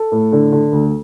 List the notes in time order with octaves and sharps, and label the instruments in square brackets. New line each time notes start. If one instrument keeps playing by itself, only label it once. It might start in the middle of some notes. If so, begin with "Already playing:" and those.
Already playing: [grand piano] A4
A2
D3
D3
D2